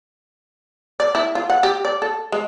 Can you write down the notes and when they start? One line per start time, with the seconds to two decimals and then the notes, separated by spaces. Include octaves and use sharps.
1.00 D5
1.15 E4
1.35 F4
1.50 F#5
1.63 G4
1.85 D5
2.02 A4
2.32 G#3